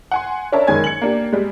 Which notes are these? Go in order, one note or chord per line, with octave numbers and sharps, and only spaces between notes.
F#5 G#5 C6
C#4 D4 A#4 C#5 E5 A5
F#1 D#3 G#3 C#5 G#5 G#6
C#7 F#7
A#3 D4 G4
G3 G#3